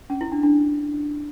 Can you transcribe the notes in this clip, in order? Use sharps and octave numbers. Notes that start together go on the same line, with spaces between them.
C#4
E4
D4
D4